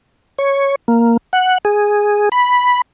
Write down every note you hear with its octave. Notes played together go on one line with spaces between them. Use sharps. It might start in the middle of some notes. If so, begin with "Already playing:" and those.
C#5
A#3
F#5
G#4
B5